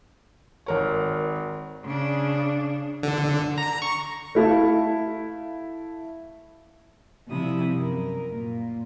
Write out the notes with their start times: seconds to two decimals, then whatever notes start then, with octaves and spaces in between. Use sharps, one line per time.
0.66 G#1 A#4 C#5
1.84 C#3 D4
3.03 D3
3.58 A#5
3.82 C#6
4.35 A3 E4 A4 F5
7.28 C3 F3 G3 E4 D#6
7.77 F#2 A#4
8.33 A#2